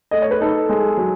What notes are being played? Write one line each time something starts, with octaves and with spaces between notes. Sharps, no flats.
A3 D#5
C#5
B4
D#4 A4
G#3
F#3